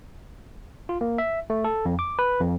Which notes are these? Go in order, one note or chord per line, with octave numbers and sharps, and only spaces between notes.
F4
A#3
E5
A3
A4
F2
D6
B4
F2